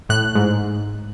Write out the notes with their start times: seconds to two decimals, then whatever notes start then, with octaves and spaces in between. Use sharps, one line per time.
0.09 A2 F#6
0.35 G#2